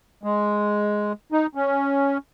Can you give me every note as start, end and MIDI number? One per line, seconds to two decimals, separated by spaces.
0.23 1.12 56
1.32 1.46 63
1.55 2.18 61